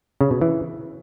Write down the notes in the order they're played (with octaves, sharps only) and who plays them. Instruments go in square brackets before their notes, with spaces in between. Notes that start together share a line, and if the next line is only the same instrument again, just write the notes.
[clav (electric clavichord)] C#3
B2
E3